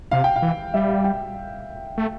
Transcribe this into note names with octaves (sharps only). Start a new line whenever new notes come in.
C3 F5
G5
F5
E3
G3 E5
F5
G5
A3